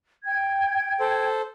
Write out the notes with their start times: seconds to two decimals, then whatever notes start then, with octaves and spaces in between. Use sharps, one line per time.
0.25 G5 G#6
1.00 A4 C5